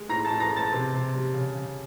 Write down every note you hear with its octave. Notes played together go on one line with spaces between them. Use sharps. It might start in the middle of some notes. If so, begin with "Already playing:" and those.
Already playing: G#3
A2 A#5 A#6
A5 A6
A2
A#5 A#6
G#3
A5 A6
C3
C3
G3
C#3
C#3